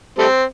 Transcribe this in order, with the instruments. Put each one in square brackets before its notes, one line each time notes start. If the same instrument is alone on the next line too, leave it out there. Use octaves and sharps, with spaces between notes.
[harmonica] G3 A3 C4